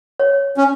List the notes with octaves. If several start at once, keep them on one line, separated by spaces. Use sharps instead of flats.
C#5
C#4